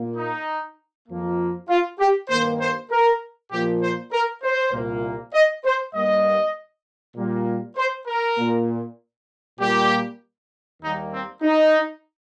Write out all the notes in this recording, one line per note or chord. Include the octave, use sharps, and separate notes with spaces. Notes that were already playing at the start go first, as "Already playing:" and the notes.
Already playing: A#2 A#3
D#4
F2 F3 A#3
F4
G4
G2 D#3 A#3 C5
C5
A#4
A#2 F3 A#3 G4
C5
A#4
C5
C2 A#2 A#3
D#5
C5
G2 G3 A#3 D#5
A#2 G3 A#3
C5
A#4
A#2 A#3
A#2 G3 A#3 G4
D#2 D#3 G3 A#3 D#4
C4
D#4